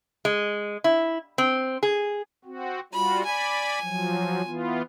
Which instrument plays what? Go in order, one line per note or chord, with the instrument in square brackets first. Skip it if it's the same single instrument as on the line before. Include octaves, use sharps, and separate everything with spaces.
[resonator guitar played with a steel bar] G#3
E4
C4
G#4
[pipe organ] C4 F#4
[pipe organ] G3 F4 F#4 [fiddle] B5
[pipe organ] D5 B5 [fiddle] G#5
[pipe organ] F3 F#3
E3 B3 F4